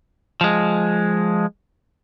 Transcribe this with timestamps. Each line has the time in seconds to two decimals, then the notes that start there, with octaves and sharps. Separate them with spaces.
0.41 F3 G#3